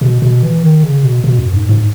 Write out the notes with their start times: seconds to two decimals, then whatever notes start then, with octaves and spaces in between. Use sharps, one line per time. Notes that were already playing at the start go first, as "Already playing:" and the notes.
0.01 B2
0.22 B2
0.43 E3
0.62 D#3
0.83 C#3
1.03 B2
1.24 B2
1.39 F#2
1.53 G#2
1.69 G#2